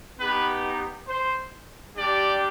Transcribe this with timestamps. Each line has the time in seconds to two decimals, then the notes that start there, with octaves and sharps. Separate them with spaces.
0.19 B3 D#4 G4 B4
1.07 C5
1.95 G3 D4 G4 D5